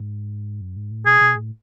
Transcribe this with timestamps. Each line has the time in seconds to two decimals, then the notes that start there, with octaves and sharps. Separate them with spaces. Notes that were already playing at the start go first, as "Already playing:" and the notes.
Already playing: G#2
0.61 F#2
0.76 G#2
0.91 A2
1.06 B2 G#4
1.21 B2
1.35 A2